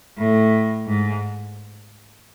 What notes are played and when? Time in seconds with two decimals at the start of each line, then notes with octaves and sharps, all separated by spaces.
0.18 A2
0.86 G#2